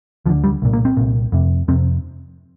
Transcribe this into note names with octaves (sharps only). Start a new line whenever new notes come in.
D2 D3 F3
G3
C2 A#2
A#3
C4
C2 A#2
F2 C3
F2 C3 C4